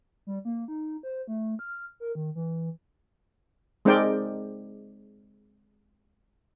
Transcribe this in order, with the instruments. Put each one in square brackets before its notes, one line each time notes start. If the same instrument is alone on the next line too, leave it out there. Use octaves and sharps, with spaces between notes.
[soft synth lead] G3
A#3
D#4
C5
A3
F6
A#4
D#3
E3
[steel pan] G#3 C4 D#4 A#4 D5 G5